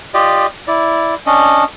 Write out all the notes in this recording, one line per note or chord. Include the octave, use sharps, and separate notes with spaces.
F4 G4 D5 D#5
E4 D5
C#4 D4 D#5